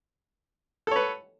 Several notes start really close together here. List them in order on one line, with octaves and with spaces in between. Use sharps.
A4 C#5 B4